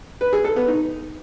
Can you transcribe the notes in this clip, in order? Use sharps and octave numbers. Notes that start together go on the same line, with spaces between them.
B4
G#4
A4
B3
D#4